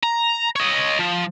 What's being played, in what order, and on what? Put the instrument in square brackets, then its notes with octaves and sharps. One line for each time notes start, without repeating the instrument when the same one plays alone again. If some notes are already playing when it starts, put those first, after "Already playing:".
[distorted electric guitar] A#5
C#5 D#5
F3